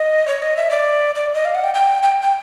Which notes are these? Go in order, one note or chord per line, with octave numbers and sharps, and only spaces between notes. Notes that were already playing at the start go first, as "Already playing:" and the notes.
Already playing: D#5
C#5
D#5
E5
D5
D5
D#5
F5
F#5
G5
G5
G5
G5